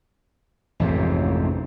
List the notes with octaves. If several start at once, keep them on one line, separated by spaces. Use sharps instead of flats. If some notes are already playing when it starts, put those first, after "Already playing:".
A1 F2 G#2 C3